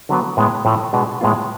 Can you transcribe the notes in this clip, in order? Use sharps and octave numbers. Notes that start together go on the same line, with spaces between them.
D3 F#3 B3
A2 G#3 B3
A2 F3 A3
B2 G#3 B3 D4
A2 G#3 B3 F4